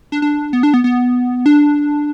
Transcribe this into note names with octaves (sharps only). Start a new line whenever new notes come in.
D4
D4
B3
D4
B3
B3
D4